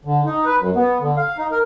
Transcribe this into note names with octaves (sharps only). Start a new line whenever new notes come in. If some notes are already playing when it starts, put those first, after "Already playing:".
D3
D#4
B4
F#2
B3
D3
F5
D#4
A#4